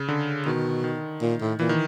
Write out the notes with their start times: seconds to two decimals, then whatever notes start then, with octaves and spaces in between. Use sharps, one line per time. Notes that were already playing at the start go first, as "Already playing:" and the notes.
Already playing: C#3
0.08 D3
0.46 B2 D#3
0.84 D#3
1.22 A#2
1.41 A2
1.59 A#2 E3
1.69 D#3